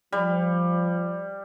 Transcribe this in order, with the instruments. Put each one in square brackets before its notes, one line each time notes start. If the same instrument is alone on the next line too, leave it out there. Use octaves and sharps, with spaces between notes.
[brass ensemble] F3 [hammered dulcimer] G3